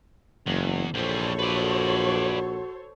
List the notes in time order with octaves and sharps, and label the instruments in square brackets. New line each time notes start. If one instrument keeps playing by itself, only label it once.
[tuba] F#1 [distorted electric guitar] E2
[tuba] A#1 [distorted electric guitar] E2 G3 [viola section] A4 C5 C#5
[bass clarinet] F#4 [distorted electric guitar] B4 D5